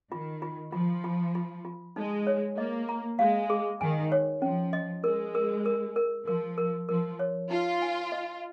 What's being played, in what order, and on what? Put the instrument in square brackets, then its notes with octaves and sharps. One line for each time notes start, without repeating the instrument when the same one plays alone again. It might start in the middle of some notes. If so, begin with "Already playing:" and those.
[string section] D#3 [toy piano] F4
[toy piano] F4
[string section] F3 [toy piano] F4
[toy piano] F4
F4
F4
[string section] G#3 [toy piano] D#4
[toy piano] C#5
[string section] A#3 [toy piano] D#5
[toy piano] A#5
[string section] G#3 [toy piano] F5
[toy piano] G#4
[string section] D#3 [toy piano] G#5
[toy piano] C#5
[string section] F3 [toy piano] C#4
[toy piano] D#5
[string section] G#3 [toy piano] A#4
[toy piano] A#4
A#4
A#4
[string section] F3 [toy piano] A#4
[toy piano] A#4
[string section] F3 [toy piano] A#4
[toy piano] C#5
[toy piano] D#4 [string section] F4
[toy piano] G#5
D#5